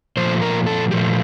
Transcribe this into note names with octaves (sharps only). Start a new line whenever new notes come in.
A#2 F3 A3 C5
A#4
A4
A#2 F3 A3 G4